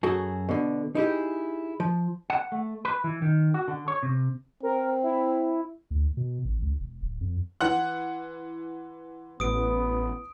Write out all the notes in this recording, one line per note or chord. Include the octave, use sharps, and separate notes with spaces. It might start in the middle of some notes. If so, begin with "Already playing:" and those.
F#2 F#4 G#4 A4
B2 D3
D#4 E4 G4 G#4
F3
F#5
A3
B4
E3
D#3
F#4
D3
C#5
C3
C4 A#4
E4
D2
B2
A1
C#2
E1
D1
F2
E3 F#5 C6 F#6
A1 B3 D#6 D7